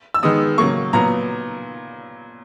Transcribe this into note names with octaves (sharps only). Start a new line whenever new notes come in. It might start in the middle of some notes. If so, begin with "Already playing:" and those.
E6
D#3 G#3 B3 D#6
C#3 F#3 A#3 C#6
A#2 F#3 B3 A#5